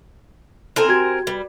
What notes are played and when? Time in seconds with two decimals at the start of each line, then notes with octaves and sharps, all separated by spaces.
0.76 C4 E4 A4 A#4 C5 G#5
0.89 F#4 G4 G#6
1.27 G3 B4